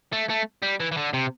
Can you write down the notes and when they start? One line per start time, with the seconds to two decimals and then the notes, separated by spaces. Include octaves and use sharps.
0.13 A3
0.30 A3
0.62 G3
0.80 E3
0.92 E3
0.97 D3
1.14 C3